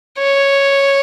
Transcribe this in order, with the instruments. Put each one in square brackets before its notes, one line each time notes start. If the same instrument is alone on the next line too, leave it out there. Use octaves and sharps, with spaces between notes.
[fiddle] C#5